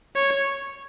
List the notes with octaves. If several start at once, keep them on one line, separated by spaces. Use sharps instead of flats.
C#5